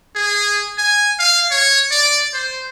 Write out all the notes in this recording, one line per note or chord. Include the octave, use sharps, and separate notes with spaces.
G#4
G#5
F5
C#5
D5
C5